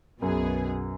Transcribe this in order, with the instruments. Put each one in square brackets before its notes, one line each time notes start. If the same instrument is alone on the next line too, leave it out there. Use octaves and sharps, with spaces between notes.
[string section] B1 B2 B3 G#4 [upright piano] F#2